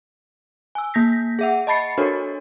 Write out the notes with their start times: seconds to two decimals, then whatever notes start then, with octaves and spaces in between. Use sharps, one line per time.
0.75 G#5 E6
0.94 A#3 G6 A#6 B6
1.39 G#4 E5 F#5
1.67 D#5 A5 B5 A6 C7 C#7
1.98 D4 F#4 A4 A#4 C#5